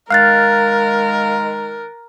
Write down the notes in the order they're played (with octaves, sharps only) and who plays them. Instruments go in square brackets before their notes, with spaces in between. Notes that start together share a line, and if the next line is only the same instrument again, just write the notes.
[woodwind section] D#3 G#3 [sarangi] A#4 [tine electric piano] F5 [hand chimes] F6 F#6 A6